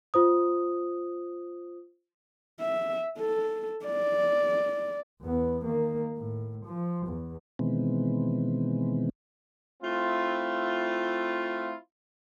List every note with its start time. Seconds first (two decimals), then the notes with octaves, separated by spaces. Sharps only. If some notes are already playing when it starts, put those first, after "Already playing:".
0.14 F4 C5 D#6
2.60 E5
3.19 A4
3.86 D5
5.22 E2 B3
5.65 D#3 A#3
6.18 A2
6.66 F3
7.07 E2
7.59 B2 D#3 E3 G#3 B3 C4
9.82 A3 C4 E4 F4